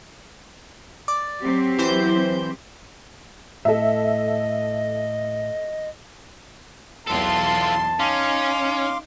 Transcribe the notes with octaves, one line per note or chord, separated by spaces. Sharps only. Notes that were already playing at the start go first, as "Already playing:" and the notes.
D5
F#3 C4 G4
E3 C5 G6
A2 A4 D#5 E5
B1 E2 F4 A4 A5 C6
C#4 D#4 F5 C6 D6